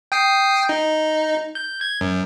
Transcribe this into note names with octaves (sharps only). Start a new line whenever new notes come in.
G5 D#6 C7
D#4
G6
G#6
F#2